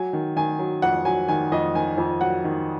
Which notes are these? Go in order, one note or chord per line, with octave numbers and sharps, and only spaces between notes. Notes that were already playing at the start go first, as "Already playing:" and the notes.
Already playing: F#3 G#5
D#3
D#3 G#5
F#3
F2 F#5
F#3 G#5
D#3 G#5
F2 D#5
D#3 G#5
F2
F#3 F#5
D#3